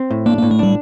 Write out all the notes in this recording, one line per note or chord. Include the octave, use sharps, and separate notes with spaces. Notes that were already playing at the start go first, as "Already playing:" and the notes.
Already playing: C4
A2
A#3 D4
A2 A#3
A3
G3 D4